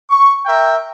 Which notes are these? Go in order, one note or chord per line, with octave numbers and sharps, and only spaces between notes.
C#6
A#4 E5 G5